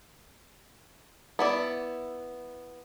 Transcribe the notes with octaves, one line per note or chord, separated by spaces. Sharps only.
B3 E4 D5